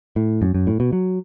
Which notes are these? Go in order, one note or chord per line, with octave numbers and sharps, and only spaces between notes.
A2
F#2
F#2
A2
B2
F#3